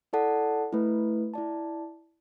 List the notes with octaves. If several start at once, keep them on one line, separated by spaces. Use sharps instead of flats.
E4 A4 D5 F#5 A5
A3 E4 B4
E4 D5 A5